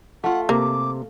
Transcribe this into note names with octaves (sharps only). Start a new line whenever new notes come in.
A3 F4 F#5
C3 A#3 D6